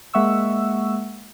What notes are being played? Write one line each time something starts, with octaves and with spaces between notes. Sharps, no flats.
G#3 A#3 E5 F#5 C#6 E6